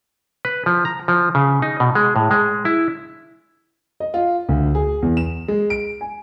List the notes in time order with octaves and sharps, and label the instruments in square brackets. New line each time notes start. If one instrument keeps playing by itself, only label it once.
[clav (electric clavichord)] B4
F3
A#5
F3
C#3
D#4
B2
G#3
A2
G#3
E4
[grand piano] D#5
F4
D2
G#4
E2
E7
G#3
D7
G#5